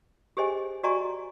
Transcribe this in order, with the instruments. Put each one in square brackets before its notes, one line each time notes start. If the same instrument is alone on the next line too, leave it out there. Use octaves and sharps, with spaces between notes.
[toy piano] G4 G#4 C5 D#5 G#5
F#4 D5 D#5 G#5 A#5 C#6